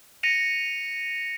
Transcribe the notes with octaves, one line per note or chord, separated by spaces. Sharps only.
A#6 C#7 D#7 F7